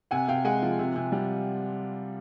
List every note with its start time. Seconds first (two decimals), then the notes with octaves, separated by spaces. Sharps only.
0.11 C3 F#5 G#5
0.28 C3 F5 G5
0.45 G#3 F#5 G#5
0.62 F3
0.79 C3
0.96 C3
1.12 G3